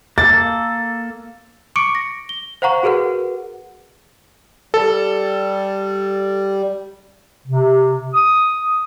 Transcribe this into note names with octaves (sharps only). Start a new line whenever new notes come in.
A#3 A4 A6
C#6 D6 C#7 D7
A#6
G7
C5 F5 F#5 A#5 C#6
F#4 G#4 A#4 B4 F#5
G3 A4
C3
D#6